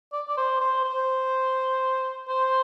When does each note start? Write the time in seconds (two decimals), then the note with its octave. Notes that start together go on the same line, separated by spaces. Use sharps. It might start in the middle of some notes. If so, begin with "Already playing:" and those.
0.13 D5
0.28 D5
0.37 C5
0.61 C5
0.84 C5
2.28 C5